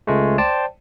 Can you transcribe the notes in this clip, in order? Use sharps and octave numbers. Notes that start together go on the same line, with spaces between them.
C#2 G#3 A3
C5 D5 G5 A5